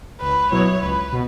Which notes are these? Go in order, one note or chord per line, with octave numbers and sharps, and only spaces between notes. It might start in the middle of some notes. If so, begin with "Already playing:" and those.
C#2 B4
B2 F#3 B3 E4 C#5
C#2 B4
B2